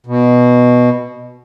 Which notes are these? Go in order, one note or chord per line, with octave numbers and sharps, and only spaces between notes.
B2